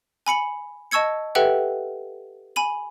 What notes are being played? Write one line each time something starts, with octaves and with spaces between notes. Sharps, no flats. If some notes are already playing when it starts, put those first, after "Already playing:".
G#5 B5 C#7 F#7
D#5 A5 C#6 E6 G#6 C#7
G4 A4 B4 E5 F#5 G5
G#5 B5 D#7 F#7